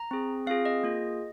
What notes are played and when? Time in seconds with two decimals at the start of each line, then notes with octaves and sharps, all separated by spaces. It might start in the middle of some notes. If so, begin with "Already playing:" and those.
Already playing: A#5
0.11 C4 G#4
0.47 C4 F4 G#4 F5
0.65 D#5
0.83 A#3 F4 G#4